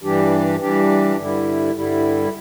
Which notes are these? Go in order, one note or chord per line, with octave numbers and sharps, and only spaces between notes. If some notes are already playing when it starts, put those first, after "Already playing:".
G2 E3 G3 D4 G4
G2 E3 G3 D4 G4
G2 D3 G3 E4
G2 D3 G3 E4